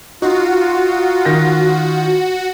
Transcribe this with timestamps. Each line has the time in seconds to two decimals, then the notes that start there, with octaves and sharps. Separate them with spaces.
0.22 D#4 F4 F#4
1.25 D#3 A#6